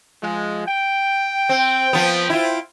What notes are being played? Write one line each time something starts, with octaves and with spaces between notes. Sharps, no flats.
F3 G#3
G5
C4
F3 B3
E4 F4